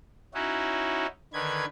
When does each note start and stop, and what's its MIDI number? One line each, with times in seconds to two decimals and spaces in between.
0.34 1.06 61
0.34 1.06 63
0.34 1.06 64
0.34 1.06 66
1.33 1.65 50
1.33 1.65 51
1.33 1.65 71
1.33 1.65 92